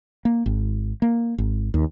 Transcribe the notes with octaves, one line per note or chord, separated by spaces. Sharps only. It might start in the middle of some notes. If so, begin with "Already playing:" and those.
A#3
G#1
A#3
G#1
D#2